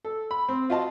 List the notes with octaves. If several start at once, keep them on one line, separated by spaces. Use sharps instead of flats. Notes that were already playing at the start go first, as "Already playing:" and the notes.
A4
B5
C4
F4 F#4 D#5 F5 A5